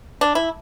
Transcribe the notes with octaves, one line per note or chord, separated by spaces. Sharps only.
D4
E4